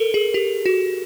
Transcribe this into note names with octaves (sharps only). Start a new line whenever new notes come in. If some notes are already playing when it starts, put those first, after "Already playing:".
Already playing: A4 A#4
G#4
G4
F#4